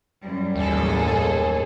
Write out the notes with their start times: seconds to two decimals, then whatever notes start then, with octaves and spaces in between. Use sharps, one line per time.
0.24 F#2 G3
0.56 A1 D#2 G#4 A4